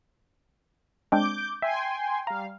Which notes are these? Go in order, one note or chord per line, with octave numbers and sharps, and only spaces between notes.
G#3 C4 D4 D6 G6
E5 G5 G#5 C6
G3 F5 A#5